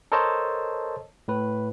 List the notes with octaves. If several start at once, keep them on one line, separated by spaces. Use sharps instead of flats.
A4 A#4 C5 C#5 D#5 A5
A2 B4